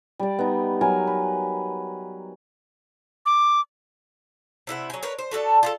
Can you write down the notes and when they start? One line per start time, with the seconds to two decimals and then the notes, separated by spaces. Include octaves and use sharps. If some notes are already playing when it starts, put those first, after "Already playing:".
0.19 G3 D5
0.39 B3 D#4
0.81 F#3 A#4 G#5
1.07 B4
3.26 D6
4.67 C3 E4 A#4 F#5
4.90 F#3 G#5
5.03 A#4 B4 C#5
5.19 C5
5.31 A3 F#4 A4 D5
5.63 F4 G#4 A4